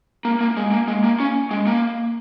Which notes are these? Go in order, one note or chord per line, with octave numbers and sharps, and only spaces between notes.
A#3
A#3
G#3
A#3
G#3
A#3
C#4
G#3
A#3